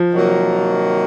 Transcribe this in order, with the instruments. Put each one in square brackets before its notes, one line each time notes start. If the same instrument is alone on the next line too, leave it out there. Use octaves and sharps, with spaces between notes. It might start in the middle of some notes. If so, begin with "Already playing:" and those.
Already playing: [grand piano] F3
[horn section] C3 D#3 F#3 A#3